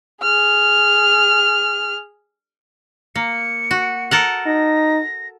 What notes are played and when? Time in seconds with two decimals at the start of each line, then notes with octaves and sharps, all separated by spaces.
0.22 G#4 F6
3.15 A#3 C#7
3.71 F#4
4.11 A4 A#4 F#5
4.46 D#4 A#6